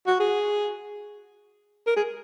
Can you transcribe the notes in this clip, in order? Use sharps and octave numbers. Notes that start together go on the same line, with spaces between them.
F#4
G#4
A#4
G#4